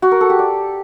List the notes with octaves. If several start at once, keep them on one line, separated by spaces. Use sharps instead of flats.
F#4
A#4
A4
G4
D5